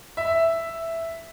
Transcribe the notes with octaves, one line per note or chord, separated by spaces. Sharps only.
E5